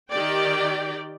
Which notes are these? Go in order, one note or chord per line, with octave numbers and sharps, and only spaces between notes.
D#3 G4 D5 G5